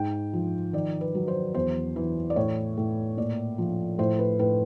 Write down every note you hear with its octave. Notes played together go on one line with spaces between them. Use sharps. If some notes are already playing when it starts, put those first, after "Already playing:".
Already playing: G#2 G5
F3
D#3 D5
B4
F#3
C5
E2 C5
E3
D5
A2 C#5
A2
A#2 D5
F3
A2 C5
B4
A2 B4